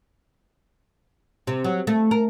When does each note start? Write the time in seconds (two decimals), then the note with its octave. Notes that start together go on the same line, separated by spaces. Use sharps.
1.47 C3
1.64 F#3
1.87 A3
2.11 A#4